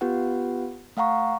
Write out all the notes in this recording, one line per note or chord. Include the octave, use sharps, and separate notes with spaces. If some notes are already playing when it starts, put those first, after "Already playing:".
B3 F4 G4 B4 F#5
A3 F5 F#5 A#5 C#6